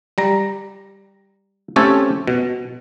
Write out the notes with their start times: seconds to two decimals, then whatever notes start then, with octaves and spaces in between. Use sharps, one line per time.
0.18 G3 A#5
1.76 A3 C4 C#4 G4 A4 C#5
2.27 B2